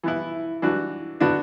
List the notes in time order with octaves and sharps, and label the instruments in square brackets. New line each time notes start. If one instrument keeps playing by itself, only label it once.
[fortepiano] E3 B3 E4
E3 D4 F#4
D3 B3 D4 F#4